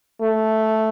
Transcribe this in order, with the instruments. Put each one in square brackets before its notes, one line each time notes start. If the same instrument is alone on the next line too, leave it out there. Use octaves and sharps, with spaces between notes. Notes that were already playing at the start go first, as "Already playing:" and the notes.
[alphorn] A3